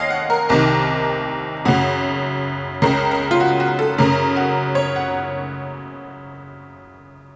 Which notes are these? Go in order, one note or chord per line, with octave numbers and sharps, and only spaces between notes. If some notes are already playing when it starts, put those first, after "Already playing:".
Already playing: D#2 C#5 D#5 F5
F#5
A#4
C2 C3 D#3 A#4
F#2 C#3 F#4
C#2 C#3 A#4
A#4
F4
F#4
F#4
A4
F#2 C#3 A#4
F#4
C#5
F#5